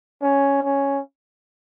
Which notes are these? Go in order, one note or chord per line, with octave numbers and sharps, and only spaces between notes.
C#4
C#4